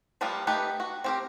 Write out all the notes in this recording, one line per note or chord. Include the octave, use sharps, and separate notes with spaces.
F3 G3 A#3 B3 F4
A3 B3 D#4 G4 B4
F#4
C4 G4 A#4